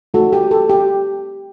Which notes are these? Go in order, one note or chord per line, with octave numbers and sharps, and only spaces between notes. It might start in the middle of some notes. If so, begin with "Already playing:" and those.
A3 D#4 F#4 A4
G4
A4
G4